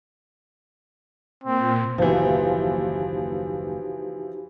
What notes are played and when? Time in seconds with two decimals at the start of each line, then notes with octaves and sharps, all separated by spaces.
1.44 A#2 C4
1.98 F#1 D#2 E3 F3 D#4 F#4 G4